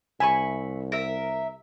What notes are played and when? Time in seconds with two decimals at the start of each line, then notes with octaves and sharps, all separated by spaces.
0.20 C2 E5 G#5 B5 C#6
0.92 A#4 E5